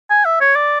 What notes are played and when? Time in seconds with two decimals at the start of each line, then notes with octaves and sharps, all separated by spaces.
0.10 G#5
0.25 E5
0.41 C#5
0.55 D5